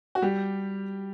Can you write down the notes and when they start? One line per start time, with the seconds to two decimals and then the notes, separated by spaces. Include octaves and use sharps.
0.15 F#4
0.22 G3 G4